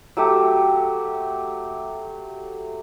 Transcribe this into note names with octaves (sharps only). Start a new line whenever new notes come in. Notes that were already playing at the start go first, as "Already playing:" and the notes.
F#3 A3 G4